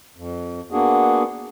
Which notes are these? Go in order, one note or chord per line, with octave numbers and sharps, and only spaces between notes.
F2
A#3 B3 D4 F#4 G#4